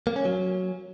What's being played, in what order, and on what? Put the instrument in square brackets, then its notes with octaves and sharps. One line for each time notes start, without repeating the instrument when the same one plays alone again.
[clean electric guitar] A#3
C#4
F#3